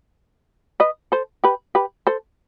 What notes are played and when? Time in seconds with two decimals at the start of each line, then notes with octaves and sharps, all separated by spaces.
0.80 B4 D#5
1.12 A4 C5
1.44 G4 B4
1.75 G4 B4
2.07 A4 C5